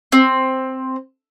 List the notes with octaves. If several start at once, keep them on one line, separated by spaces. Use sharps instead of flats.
C4